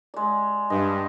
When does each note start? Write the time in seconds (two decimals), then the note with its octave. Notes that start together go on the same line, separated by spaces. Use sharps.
0.14 G#3 D5
0.70 G2 D#5